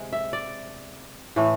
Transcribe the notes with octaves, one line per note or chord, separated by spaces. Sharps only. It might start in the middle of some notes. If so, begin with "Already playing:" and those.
Already playing: C3 G#3
E5
D5
A2 E3 A3